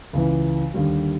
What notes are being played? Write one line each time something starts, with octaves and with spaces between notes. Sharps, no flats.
C#2 C#3 E3
D#2 D3 G3